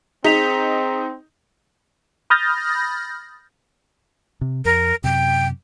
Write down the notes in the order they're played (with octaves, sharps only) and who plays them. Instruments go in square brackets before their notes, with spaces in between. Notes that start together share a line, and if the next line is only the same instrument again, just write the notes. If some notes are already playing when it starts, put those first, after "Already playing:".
[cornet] C4 [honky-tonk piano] D#4 [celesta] G#4 B6 F7
[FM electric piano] B5 D#6 F6 G6 A6 A#6
[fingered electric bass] C3
[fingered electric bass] F2 [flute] A#4
[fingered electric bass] F#2 C3 [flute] G5